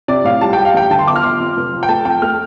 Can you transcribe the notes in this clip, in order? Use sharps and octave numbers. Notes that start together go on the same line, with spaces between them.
C3 D5
A2 F5
G3 A5
G3 G5
F5
A1 G5
D3 A5
C6
G1 D6
F6
G1 C6
F2
F1
F3
G5
A3 A5
F2 G5
A3 F6